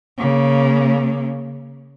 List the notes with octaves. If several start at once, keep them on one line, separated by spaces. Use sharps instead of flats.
C#3 A#3